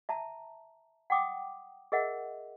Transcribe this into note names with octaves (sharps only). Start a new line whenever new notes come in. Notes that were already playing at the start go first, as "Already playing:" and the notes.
E5 A5 A#5
F#5 G5 D6 D#6
G#4 A#4 D#5 E5 F#5